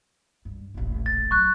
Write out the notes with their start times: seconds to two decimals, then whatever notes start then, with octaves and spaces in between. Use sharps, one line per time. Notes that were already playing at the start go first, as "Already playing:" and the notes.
0.45 G2
0.74 D#1 A1
1.06 A6
1.31 F#3 C#6 F#6